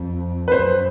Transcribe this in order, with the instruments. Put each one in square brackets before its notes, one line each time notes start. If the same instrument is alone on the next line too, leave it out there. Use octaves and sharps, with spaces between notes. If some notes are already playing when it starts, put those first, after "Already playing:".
Already playing: [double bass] F2
[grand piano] B4
[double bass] F#2 [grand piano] C5